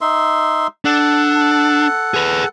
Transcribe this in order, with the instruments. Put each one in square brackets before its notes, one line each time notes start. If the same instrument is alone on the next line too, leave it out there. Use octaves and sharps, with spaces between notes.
[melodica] D#4 E5 C6
[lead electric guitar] D4 [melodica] A4 F#5
[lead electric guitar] G#4 B4